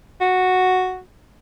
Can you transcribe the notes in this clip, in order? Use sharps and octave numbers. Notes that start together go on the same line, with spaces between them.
F#4